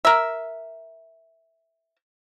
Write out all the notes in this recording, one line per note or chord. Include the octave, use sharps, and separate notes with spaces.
A#4 E5